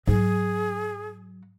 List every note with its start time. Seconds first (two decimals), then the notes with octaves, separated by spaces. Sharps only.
0.08 G#2 F#3 G#4